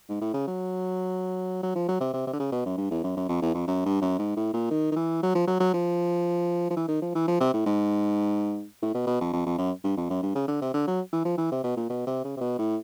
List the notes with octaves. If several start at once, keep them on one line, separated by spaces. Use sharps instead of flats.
G#2
A2
C#3
F#3
F#3
F3
F#3
C3
C3
C3
D3
C#3
B2
F#2
G2
E2
F#2
F#2
F2
E2
F2
F#2
G2
F#2
G#2
A2
A#2
D#3
D#3
E3
F#3
F3
F#3
F#3
F3
F3
E3
D#3
F3
E3
F3
C3
A2
G#2
A2
B2
B2
F2
F2
F2
F#2
G2
F2
F#2
G2
C#3
D3
C3
D3
F#3
E3
F3
E3
C3
B2
A#2
B2
C3
C#3
C3
B2
A2